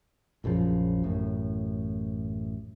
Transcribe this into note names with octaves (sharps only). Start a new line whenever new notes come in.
A#1 F#2 C#3 F3
A1 F#2 A2